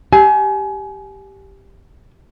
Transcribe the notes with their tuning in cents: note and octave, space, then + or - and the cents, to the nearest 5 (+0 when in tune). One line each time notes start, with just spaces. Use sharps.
G4 +0 G#5 +30